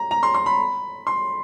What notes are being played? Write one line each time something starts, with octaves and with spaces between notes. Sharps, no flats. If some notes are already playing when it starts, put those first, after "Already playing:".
Already playing: A#5
A#5
C6
C6
B5
C6